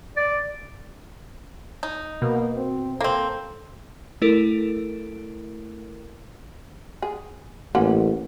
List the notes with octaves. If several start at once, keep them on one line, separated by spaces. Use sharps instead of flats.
D5
D#4
B2 A#3
C4
A#3 C4 A4
A3 E4 A4 A#4 D7
G#4
A1 A#3 C#4 F#5